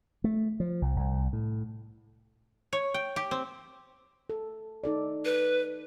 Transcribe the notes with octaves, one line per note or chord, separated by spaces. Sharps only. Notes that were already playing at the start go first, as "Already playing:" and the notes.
A3
F3
C2
C2
A2
C#5
G5
G4
C4
A4
D#4 A4 D5
B4